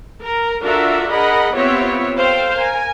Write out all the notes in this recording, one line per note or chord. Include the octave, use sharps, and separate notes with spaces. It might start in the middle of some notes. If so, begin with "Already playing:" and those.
A#4
D4 F4 F#4 A4 A#4 E5
G#4 A#4 D#5 F#5 B5
B3 C4 F4 G4 C#5 E5
A4 C5 F5 G5
A#4 G#5